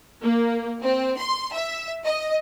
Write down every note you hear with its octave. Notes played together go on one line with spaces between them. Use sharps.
A#3
C4
C6
E5
D#5